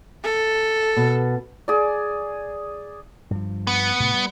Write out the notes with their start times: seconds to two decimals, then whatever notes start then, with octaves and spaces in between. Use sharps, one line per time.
0.24 A4
0.97 B2
1.68 G#4 D5
3.31 G2 F3
3.67 B3
4.00 A2 C3
4.14 G3